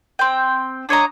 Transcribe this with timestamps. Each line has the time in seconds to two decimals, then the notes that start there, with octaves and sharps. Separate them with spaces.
0.19 C4 G5
0.89 D4 C#5 D#5 A#5